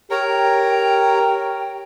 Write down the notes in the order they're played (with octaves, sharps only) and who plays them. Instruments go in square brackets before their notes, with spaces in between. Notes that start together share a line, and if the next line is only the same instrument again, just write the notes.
[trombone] G4 [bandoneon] A#4 C#5 A#5 [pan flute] G5